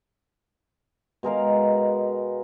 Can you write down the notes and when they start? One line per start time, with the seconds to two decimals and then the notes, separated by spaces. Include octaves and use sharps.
1.23 B2 G#3 A#4 F5